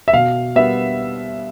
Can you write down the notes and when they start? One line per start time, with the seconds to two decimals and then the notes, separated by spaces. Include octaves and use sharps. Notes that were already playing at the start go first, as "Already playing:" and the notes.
0.08 E5
0.14 B2 F5
0.56 G3 B3 E5